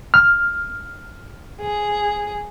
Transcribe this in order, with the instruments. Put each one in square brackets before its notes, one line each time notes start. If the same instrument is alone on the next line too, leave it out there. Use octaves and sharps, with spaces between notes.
[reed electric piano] F6
[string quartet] G#4